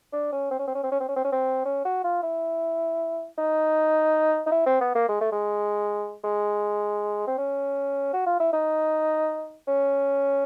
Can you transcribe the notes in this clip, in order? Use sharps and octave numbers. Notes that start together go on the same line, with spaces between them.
D4
C#4
C4
C#4
C4
C#4
C4
C#4
C4
C#4
C4
C#4
C4
C#4
F#4
F4
E4
D#4
D#4
E4
C4
B3
A#3
G#3
A3
G#3
G#3
C4
C#4
F#4
F4
E4
D#4
C#4